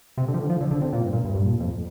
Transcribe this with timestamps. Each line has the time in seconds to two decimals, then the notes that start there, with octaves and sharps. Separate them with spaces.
0.18 C3
0.28 D3
0.34 F3
0.39 D3
0.50 F3
0.61 D3
0.71 D3
0.82 C3
0.93 A#2
1.03 G2
1.13 A#2
1.24 G2
1.35 G2
1.45 A#2
1.60 F2